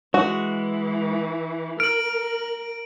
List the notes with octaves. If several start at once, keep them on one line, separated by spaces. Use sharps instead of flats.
E3 G#3 F#4
A#4 F6 D7 F#7